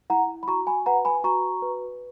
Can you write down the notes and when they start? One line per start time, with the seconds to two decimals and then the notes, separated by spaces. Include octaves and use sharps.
0.10 E4 F#5 A#5
0.43 B5
0.47 F#4 A#5 C#6
0.67 G#5 B5
0.86 B4 F#5 A#5
1.05 G#5 B5
1.24 F#4 A#5 C#6
1.62 B4